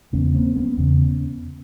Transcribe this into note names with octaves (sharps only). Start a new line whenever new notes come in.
E2 C#3 B3 C#4
A#3 C4
B3 C#4
E2 C#3